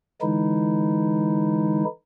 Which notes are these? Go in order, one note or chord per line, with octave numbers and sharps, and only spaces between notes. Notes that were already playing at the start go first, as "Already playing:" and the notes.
D3 E3 G#3 D#4 E4